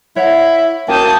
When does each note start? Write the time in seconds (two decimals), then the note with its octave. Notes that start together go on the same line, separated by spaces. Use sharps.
0.16 E4 C#5 F#5
0.88 A#3 C#4 F#4 G5 A5 D#6 G6